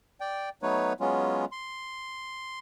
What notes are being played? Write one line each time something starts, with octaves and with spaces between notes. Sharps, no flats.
D5 G5
F#3 A3 B3 D#4 B4 C#5
F#3 G#3 B3 C#4 F4
C6